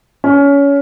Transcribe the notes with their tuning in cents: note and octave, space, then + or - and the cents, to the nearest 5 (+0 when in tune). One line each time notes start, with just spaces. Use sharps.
C#4 +25